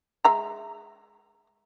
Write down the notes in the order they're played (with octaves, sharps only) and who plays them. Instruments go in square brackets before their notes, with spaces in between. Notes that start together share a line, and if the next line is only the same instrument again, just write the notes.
[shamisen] G#3 E5 A#5